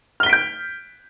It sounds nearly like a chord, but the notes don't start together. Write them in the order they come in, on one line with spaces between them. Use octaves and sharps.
F6 G7 B6 D7 G6